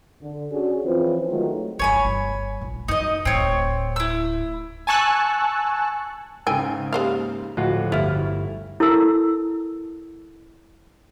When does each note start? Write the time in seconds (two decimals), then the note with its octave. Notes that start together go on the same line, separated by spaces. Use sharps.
0.22 D3
0.52 C#4 D4 F#4 G#4
0.84 E3 F3 C4 C#4 F4 B4
1.29 D#3 F#3 G#3 A3 F4
1.79 G1 F2 C#5 G#5 B5
2.05 G1
2.61 A#1
2.88 F#2 D#4 D#5
3.25 D1 A2 C4 C#5
3.96 E4 E6
4.87 G#5 A5 C#6 E6 F#6
6.47 G#2 C#3 G5 G#5 E6
6.93 G#3 A#3 G4 C5 F5
7.57 D1 A2 F3 F4 F#4
7.92 G1 E4 F4 G4 F6
8.80 E4 A4 A#4 A5 E6